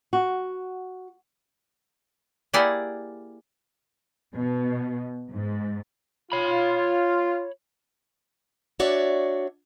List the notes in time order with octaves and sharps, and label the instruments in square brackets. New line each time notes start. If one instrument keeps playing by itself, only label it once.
[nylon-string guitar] F#4
[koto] A#3 E4 G4 G#4 D5 F#5
[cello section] B2
G#2
[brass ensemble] F4 [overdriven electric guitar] C#5 B5
[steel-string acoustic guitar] D4 F#4 C#5 D5 E5